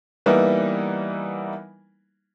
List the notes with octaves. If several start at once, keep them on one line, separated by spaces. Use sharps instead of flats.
E3 G3 A#3 B3 D#4 E4